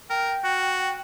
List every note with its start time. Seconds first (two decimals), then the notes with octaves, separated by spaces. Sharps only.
0.10 A#4 G5
0.44 F#4